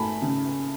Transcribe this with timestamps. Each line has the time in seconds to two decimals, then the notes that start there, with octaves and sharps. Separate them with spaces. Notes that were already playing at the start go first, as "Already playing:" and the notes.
Already playing: A3 G#5 A5 B5
0.22 C#3